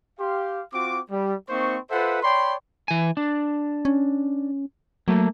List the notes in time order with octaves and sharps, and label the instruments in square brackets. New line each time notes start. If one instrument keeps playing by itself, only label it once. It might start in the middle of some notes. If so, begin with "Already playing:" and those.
[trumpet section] G4 F5 C6
C4 F4 F#4 D6
G3
A#3 C4 D#4 C5 C#6
F4 A4 B4 C5 E5 F#5
C#5 D5 G5 B5 C6
[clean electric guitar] E3 G#5
D4
[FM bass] C#4
[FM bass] F#3 [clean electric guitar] A3 A#3